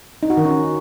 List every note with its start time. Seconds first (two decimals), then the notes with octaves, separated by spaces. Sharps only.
0.23 D#4
0.30 F#4
0.37 D#3
0.45 C#4